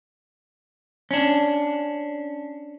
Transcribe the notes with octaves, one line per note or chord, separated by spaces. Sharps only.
C#4 D4